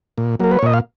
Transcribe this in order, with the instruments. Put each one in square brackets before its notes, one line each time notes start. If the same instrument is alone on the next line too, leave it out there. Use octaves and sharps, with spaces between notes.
[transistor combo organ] A#2
F#3 A#3 A#4
B4
C#5
A#2 D#5
F5